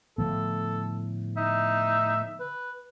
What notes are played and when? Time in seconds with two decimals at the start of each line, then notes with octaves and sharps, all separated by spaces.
0.18 A2 D3 F3 B3 A4
1.37 D#4 E5
2.40 B4